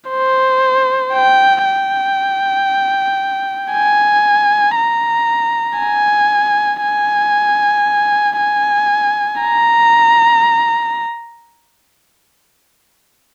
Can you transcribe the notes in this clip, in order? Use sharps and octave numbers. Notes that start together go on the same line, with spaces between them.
C5
G5
G5
G#5
A#5
G#5
G#5
G#5
A#5